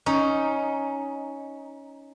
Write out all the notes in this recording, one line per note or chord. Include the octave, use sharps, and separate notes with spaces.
C#4 D#4